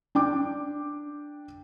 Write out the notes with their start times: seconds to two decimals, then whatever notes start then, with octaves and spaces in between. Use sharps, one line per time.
0.15 D4 G5 D6